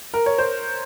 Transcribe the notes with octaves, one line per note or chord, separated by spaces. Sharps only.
A#4
C#5
C5